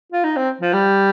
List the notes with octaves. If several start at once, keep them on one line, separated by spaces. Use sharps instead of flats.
F4
D#4
C4
F3
G3